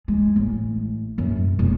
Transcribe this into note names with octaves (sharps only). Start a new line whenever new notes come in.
G#3
A1
F#2
E1